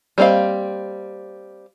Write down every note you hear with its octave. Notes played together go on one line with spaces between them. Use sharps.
G3 A#3 C4 D#5 F5